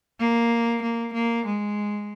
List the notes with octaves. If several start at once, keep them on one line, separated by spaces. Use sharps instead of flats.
A#3
A#3
A#3
G#3